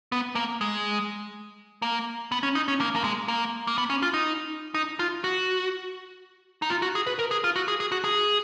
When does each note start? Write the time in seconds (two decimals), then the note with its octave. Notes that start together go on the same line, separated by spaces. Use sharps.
0.12 B3
0.35 A#3
0.61 G#3
1.82 A#3
2.32 B3
2.43 C#4
2.55 D#4
2.68 C#4
2.80 A#3
2.96 A#3
3.04 G#3
3.28 A#3
3.67 A#3
3.78 B3
3.90 C#4
4.02 F4
4.14 D#4
4.74 D#4
4.99 F4
5.24 F#4
6.62 D#4
6.70 F4
6.82 F#4
6.95 G#4
7.07 B4
7.19 A#4
7.31 G#4
7.44 F4
7.56 F#4
7.68 G#4
7.80 G#4
7.92 F#4
8.04 G#4